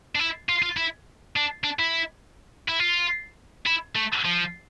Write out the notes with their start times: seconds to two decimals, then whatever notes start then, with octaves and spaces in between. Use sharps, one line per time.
0.15 D4
0.19 E4
0.49 F4
0.63 F4
0.77 E4
1.36 D4
1.64 D4
1.79 E4
2.68 E4
2.80 F4
3.66 E4
3.96 A3
4.25 F3